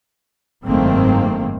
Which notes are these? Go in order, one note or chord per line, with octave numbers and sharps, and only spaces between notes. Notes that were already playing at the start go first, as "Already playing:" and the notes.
F#1 G#2 D#3 A3 A#3 C4